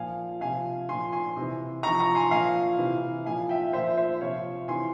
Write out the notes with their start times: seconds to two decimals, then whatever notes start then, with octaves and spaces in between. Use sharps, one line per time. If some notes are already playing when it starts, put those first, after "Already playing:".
Already playing: A#2 F3 F5 G#5
0.41 C3 F3 F5 G#5
0.89 A#2 F3 G#5 C6
1.12 G#5 C6
1.36 C3 E3
1.83 C3 F3 A#5 C#6
1.99 A#5 C#6
2.15 G#5 C6
2.31 A#2 F3 F5 G#5
2.78 C3 E3
3.25 A#2 F3 F5 G#5
3.49 E5 G5
3.73 A#2 F3 C5 E5
3.97 C5 E5
4.21 C3 F3 C#5 F5
4.68 C3 E3 G#5 C6